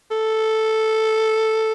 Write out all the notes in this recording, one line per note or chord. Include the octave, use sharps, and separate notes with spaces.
A4